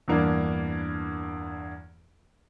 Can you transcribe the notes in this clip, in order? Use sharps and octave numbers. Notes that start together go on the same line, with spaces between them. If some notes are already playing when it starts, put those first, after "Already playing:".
E2 G2 A#3 D4